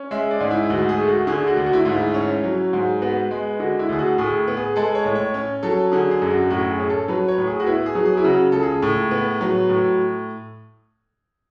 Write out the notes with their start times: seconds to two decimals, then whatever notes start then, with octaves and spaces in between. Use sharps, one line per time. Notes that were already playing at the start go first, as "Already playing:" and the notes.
Already playing: C#4
0.11 G#3 E5
0.31 D5
0.40 G#2
0.51 E4
0.70 D2 F#4
0.89 G#4
0.98 A3
1.08 F#4
1.27 D3 G#4
1.47 F#4
1.57 D2
1.66 F#4
1.73 E4
1.85 G#2 E4
2.14 C#4
2.44 F#3
2.73 G#2
3.01 B3 F#4
3.31 G#3
3.60 D3 F#4
3.79 E4
3.89 D2 G#4
3.99 F#4
4.18 A2 G#4
4.48 B3
4.56 G#4
4.76 G#3 A4
4.95 C#5
5.05 A2
5.15 C#5
5.34 C#4
5.63 F#3 A4
5.92 D3 G#4
6.11 G#4
6.22 F#2
6.30 F#4
6.50 A2 F#4
6.70 G#4
6.79 C#4
6.90 A4
7.08 F#3 B4
7.28 C#5
7.38 A2
7.47 G#4
7.60 F#4
7.66 B3 E4
7.86 G#4
7.95 F#3
8.05 G#4
8.17 E4
8.24 C#3 F#4
8.52 C#2 A4
8.63 G#4
8.82 A2
9.11 B3
9.41 F#3
9.69 A2